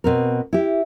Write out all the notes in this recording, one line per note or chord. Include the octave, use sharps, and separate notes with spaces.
B2 C4 A#4
E4 G4